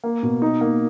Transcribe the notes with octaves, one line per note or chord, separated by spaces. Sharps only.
A#3
B2
D#4
A#3